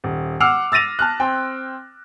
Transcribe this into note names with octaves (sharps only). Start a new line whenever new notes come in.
D#1
F#5 D6 E6 F6 C7 F7
E6 A6 A#6 D#7 F7
A5 F6 F#6
C4 G5